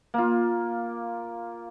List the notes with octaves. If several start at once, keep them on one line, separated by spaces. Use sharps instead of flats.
A#3 F4